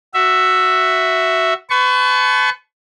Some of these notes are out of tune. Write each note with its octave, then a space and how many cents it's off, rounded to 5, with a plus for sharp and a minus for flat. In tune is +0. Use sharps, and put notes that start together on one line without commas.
F#4 +0 E5 +5
B4 +35 A5 -25 C#6 +0